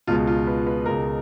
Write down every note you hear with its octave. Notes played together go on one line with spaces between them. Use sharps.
C#2 B2 G#3 F4
F4
B4
B4
C#2 B2 G#3 A#4